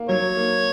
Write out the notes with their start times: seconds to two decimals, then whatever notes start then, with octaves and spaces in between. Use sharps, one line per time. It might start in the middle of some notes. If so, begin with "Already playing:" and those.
Already playing: A#3
0.09 F#3 C#5
0.37 A#3